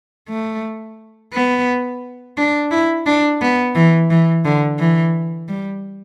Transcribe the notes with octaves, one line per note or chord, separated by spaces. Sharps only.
A3
B3
D4
E4
D4
B3
E3
E3
D3
E3
G3